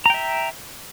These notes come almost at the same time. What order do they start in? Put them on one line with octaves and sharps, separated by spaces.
A#5 G5 E5